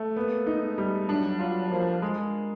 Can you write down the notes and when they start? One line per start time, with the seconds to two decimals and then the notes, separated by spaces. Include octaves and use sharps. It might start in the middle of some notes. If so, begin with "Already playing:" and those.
Already playing: A3
0.16 A#3 B3
0.47 D#4
0.63 G#3
0.78 G3
1.09 F#3 D4
1.39 F#3 F4
1.70 F3 A#3
2.02 G#3